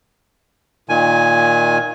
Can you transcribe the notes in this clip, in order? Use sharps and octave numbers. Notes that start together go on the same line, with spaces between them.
A#2 D#3 G#5